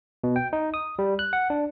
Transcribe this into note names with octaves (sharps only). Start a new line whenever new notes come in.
B2
G5
D#4
D#6
G3
F#6
F#5
D4